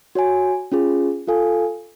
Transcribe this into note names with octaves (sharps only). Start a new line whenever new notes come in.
F#4 C#5 G#5
C#4 F4 G#4
F4 A4 F5 G#5